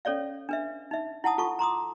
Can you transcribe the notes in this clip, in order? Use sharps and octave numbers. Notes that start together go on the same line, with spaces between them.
C#4 A4 C#5 D5 F5
D4 B4 E5
D#4 E5
E4 F#5 A5 D#6
F4 A4 A5 C#6
A#5 C6 D6 D#6